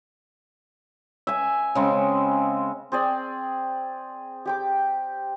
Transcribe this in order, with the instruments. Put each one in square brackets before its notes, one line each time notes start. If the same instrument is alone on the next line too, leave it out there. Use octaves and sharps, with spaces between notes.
[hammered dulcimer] E5 G#5
C#3 G#3 C4
[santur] C4 G#4 D5
G4 G5 D6